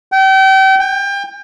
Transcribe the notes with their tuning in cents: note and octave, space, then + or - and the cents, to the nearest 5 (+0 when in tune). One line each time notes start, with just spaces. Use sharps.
G5 -35
G5 +30